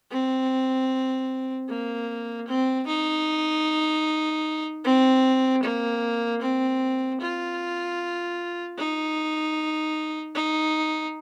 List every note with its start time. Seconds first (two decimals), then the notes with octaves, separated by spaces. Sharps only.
0.11 C4
1.68 A#3
2.47 C4
2.87 D#4
4.84 C4
5.63 A#3
6.41 C4
7.21 F4
8.78 D#4
10.35 D#4